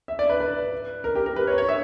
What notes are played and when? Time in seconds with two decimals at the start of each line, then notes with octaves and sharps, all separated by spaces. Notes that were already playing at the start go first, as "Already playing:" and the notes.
0.08 E5
0.19 D5
0.30 B4
0.40 B4
1.04 A#4
1.15 G4
1.26 A#4
1.36 B4
1.47 C#5
1.58 C#5
1.68 E5